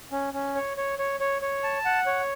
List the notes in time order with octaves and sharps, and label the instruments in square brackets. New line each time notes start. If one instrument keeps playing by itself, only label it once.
[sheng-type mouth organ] C#4
C#4
C#5
C#5
C#5
C#5
C#5
A5
F#5
C#5